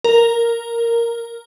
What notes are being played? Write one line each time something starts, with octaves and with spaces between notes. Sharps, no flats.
A#4